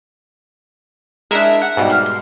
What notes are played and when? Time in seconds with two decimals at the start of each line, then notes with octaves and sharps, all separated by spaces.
1.31 G#3 D4 E4 A#4 E5
1.62 F#5
1.77 G#2 B2 G3
1.90 A#3 F6
2.06 C6